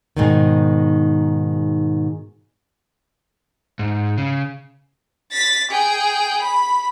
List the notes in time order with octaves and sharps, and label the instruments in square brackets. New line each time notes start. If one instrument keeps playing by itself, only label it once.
[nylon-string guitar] G#2 B2 D#3
[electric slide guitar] G#2
C#3
[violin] A6 B6
G#4 G5
B5